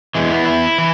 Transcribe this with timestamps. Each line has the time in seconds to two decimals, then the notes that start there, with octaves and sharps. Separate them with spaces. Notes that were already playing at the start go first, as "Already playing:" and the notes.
0.15 E2 E3 G#3
0.31 B3
0.45 E4
0.78 E3